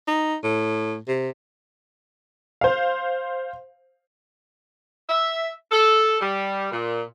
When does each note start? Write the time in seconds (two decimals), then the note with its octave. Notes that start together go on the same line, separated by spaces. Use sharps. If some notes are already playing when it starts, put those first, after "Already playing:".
0.07 D#4
0.43 A2
1.08 C3
2.61 C5 F5
5.09 E5
5.72 A4
6.21 G3
6.72 A#2